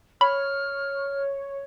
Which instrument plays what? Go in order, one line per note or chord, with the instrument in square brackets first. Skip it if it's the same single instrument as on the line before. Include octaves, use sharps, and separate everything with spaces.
[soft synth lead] C#5 [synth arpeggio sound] B5 [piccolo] F6